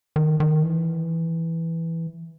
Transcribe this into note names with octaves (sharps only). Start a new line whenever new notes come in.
D#3
D#3
E3